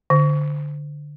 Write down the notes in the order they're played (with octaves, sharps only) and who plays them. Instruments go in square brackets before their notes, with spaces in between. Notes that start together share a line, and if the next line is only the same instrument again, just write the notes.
[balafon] D3